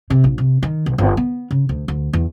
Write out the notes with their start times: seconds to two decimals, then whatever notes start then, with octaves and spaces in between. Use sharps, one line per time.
0.10 C3
0.24 A#1
0.38 C3
0.63 D#3
0.86 B1
0.98 G1
1.17 B3
1.51 C#3
1.69 D2
1.88 D2
2.13 E2